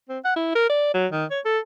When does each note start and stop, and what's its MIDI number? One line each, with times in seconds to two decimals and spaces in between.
0.09 0.18 60
0.25 0.32 78
0.36 0.53 64
0.55 0.69 70
0.69 0.92 74
0.94 1.07 54
1.12 1.25 51
1.31 1.40 73
1.45 1.59 69